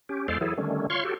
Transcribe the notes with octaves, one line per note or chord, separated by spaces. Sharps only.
C#4 G4
E2 G#3 A4 C5 D5 F5
E3 F#3 E4 G#4 A4
D3 D#3 G3 A3 C#4
F4 C#5 F5 C6 C#6
F#4 G4 A4